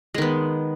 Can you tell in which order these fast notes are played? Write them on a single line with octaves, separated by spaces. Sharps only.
G#3 D#3 B3